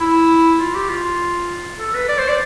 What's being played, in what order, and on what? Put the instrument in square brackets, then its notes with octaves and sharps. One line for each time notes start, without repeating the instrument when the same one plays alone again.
[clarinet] E4
F4
G4
F4
A4
B4
D5
C5
D5